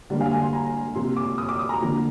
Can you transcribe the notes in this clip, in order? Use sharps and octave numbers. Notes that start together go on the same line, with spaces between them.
D3 G3 A#3 D5
F5
G#5
C6
A#5
C3 F3 A#3 C6
D6
D#6
D6
D#6
A#5
D3 F3 A#3